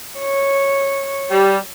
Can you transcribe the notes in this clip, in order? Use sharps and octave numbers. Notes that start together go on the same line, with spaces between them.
C#5
G3